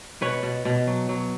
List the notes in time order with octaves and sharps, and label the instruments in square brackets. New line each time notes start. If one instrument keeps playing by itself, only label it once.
[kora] B2 B4 C#5
B2
B2
F#3
F#3